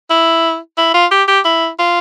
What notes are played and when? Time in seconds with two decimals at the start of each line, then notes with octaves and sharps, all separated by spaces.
0.10 E4
0.77 E4
0.94 F4
1.11 G4
1.28 G4
1.45 E4
1.79 F4